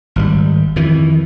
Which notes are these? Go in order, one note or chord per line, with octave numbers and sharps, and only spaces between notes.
G#1 B2 G3
F2 D#3 E3